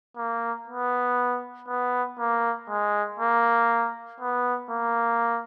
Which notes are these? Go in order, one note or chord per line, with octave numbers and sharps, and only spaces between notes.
A#3
B3
B3
A#3
G#3
A#3
B3
A#3